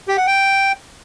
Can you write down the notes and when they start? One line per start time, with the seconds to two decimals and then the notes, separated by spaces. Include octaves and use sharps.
0.08 G4
0.17 F#5
0.27 G5